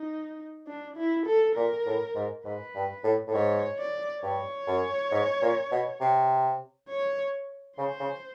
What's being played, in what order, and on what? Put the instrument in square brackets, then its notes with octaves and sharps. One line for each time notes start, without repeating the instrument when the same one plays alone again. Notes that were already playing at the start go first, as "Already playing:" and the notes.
Already playing: [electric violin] D#4
D4
E4
A4
[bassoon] A#2 [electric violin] A#4
[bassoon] A2
G#2
[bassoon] G#2 [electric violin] B4
[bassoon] G2
A2
A2
[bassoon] G#2 [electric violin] C#5
[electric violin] D5
[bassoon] G2 [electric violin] C#5
[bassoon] F#2
G#2
A#2
B2
C3
[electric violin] C#5
[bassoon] C#3 [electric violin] C5
[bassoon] C#3